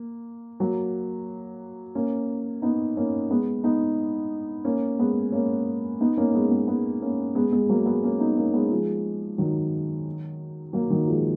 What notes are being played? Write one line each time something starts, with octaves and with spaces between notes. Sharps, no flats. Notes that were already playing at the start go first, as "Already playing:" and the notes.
Already playing: A#3
F#3 A#3
A#3 C#4
B3 D#4
A#3 C#4
G#3 B3
B3 D#4
A#3 C#4
G#3 B3
A#3 C#4
B3 D#4
A#3 C#4
G#3 B3
G#3 B3
G#3 B3
A#3 C#4
G#3 B3
G#3 B3
F#3 A#3
G#3 B3
A#3 C#4
B3 D#4
A#3 C#4
G#3 B3
F3 G#3
D#3 F#3
F#3 A#3
D#3 F#3
F3 G#3